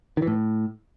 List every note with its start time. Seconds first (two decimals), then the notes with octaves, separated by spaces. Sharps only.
0.17 D#3
0.22 E3
0.27 A2